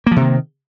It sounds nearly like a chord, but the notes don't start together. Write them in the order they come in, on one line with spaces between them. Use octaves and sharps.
A#3 F3 C3 D#3